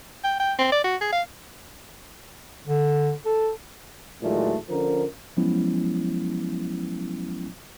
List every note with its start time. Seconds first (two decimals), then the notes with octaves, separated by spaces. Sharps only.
0.24 G5
0.40 G5
0.59 C4
0.72 D5
0.84 F#4
1.01 G#4
1.12 F5
2.67 D3
3.26 A4
4.22 D#2 A#2 E3 F#3 G#3 A3
4.69 D3 F3 C#4 A#4
5.37 F3 F#3 G#3 B3 C#4 E4